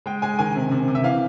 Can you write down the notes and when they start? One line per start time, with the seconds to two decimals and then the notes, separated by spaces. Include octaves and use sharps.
0.06 G#3 G5
0.22 G#3 G#5
0.39 D#3 G#5
0.56 C3
0.72 C3
0.88 C3
0.95 E5
1.04 E3 F5